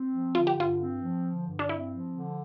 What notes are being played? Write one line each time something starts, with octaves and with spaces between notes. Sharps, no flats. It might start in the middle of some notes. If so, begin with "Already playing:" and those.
Already playing: C4
F3
D3 F4
G4
G2 F4
C4
F3
D3
G2
D4
C4 E4
F3
D3